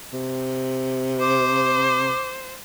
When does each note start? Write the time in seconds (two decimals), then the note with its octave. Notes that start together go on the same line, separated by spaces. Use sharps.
0.13 C3
1.20 C5 D6